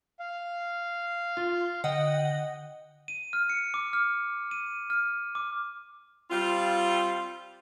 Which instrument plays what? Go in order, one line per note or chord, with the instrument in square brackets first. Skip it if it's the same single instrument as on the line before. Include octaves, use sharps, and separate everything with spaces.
[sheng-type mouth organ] F5
[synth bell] F4
[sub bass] D3 [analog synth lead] D#5 [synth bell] F#5 G5
[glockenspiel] D#7
F6
C#7
D6
F6
D#7
F6
D6
[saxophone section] G3 C4 F4